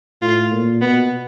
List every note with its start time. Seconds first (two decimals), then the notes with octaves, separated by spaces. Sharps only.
0.21 A2 F4
0.52 A#2
0.82 B2 B3